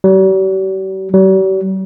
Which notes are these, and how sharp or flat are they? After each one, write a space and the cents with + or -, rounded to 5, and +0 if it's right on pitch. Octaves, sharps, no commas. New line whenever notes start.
G3 -45
G3 -45